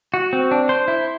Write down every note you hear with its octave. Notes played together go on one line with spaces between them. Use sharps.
F#4
C4
D4
C5
E4